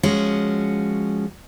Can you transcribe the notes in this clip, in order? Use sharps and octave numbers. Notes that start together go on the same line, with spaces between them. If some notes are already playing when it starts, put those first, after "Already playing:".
F3 G#3 C#4 F#4